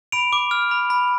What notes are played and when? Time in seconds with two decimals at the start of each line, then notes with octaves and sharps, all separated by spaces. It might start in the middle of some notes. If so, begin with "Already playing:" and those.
0.12 B5 D7 F7
0.33 D6
0.51 F6
0.71 B5
0.90 B5